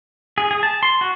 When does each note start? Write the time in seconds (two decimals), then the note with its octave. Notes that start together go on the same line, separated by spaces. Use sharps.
0.38 G#4
0.51 G#4
0.63 A5
0.83 C6
1.01 F#4